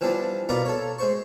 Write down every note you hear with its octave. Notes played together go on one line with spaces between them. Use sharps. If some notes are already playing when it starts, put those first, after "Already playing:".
E3 F3 G3 B3 D4
B2 B3 F4 A#4 D5
A4 C#5
G#3 C5 C#6